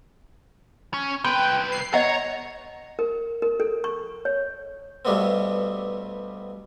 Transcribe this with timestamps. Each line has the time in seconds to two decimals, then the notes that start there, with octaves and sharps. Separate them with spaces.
0.94 C#4
1.25 C2 B4 G5 C6
1.72 C7
1.94 C#5 D#5 F#5 A#5
2.99 A#4
3.42 A#4
3.60 A4
3.84 C#6
4.25 C#5
5.05 G2 B2 G3 A3 B3 C4